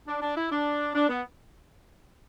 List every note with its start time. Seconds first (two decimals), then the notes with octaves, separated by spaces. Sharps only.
0.08 D4
0.22 D4
0.37 E4
0.51 D4
0.95 D4
1.09 B3